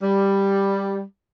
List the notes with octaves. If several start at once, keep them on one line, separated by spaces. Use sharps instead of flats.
G3